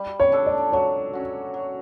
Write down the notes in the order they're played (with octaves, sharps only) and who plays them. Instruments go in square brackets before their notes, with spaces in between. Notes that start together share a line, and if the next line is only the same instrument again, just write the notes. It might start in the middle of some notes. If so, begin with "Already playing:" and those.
Already playing: [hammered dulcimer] G3
[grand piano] C#5
[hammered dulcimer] D4 A4
[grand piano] D5
[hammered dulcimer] F#3 [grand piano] C#5
[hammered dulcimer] C#4 F#4
F#3